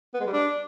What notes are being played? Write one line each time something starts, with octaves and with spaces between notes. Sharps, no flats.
B3
G#3
G3
D4